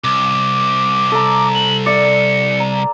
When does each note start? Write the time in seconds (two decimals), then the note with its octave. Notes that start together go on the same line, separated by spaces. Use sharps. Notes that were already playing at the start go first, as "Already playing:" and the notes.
0.04 C2 D6
1.12 A4 A#5
1.55 F#7
1.86 D5 E5 C#7
2.60 A#5